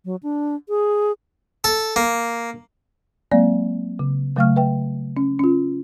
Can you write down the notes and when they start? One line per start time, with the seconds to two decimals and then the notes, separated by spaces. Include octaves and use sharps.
0.05 F#3
0.23 D4
0.69 G#4
1.64 A4
1.96 A#3
3.31 F#3 G#3 A#3 C4 D5 F5
3.99 C#3
4.36 C#3 F#3 A3 F5 C#6 F6
4.56 B4 E5 G5
5.17 C#4
5.39 C#4 F4